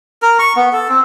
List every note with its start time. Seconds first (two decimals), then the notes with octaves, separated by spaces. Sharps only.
0.22 A#4
0.39 C#6
0.56 B3
0.73 A4
0.89 C4